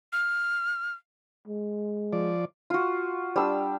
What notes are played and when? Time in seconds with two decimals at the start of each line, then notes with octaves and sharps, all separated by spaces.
0.13 F6
1.48 G#3
2.13 F3 D5
2.70 F4 F#4
3.36 G3 D4 E6